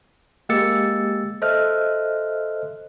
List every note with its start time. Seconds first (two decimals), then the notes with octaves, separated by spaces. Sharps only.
0.49 G#3 A#3 G4 E6 A6 C#7
1.42 A4 C5 D#5 E5 F6 F#6